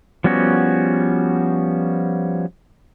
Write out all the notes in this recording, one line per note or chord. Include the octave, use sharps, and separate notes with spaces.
F3 G3 B3 C#4 F#4